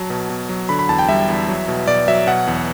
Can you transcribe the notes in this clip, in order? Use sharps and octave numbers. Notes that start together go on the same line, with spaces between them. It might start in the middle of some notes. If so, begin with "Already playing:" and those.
Already playing: F#3 A5
B2
B2
F#3
D3 B5
B5
E2 A5
G5
G3 E5
E2
F#3
B2
B2 D5
F#3 E5
B2 F#5
E2